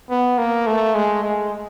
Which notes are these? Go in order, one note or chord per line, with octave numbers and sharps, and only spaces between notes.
B3
A#3
A3
G#3
G#3